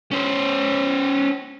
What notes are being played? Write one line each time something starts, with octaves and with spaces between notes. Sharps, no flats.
C#4 C5